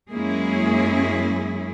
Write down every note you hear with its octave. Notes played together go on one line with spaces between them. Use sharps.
F#2 G#3 A#3 C#4 E4 G#4